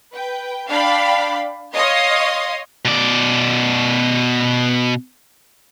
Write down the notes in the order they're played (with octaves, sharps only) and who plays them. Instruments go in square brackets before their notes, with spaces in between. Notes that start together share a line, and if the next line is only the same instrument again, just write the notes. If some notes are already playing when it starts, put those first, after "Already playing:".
[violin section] B4 G5
D4 D5 F5 G5 B5
C#5 D#5 F5 C6 D#6
[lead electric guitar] B2 D5